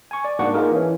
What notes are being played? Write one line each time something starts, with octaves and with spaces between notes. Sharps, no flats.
G#5 C#6
D5
G#2 A#3 D4 F#4 F#5 C#6
A#3 D#4 F4 G#4 A#4
E3 C#4